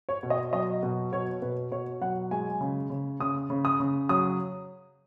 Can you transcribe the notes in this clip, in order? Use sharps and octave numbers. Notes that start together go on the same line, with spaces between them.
C#5
B2
D#5
F#3 D#5
B2
B2 C#5
B2 B4
B2 C#5
F#3 F#5
G#3 G#5
C#3
C#3
C#3 D#6
C#3
D#6
C#3
F#3 D#6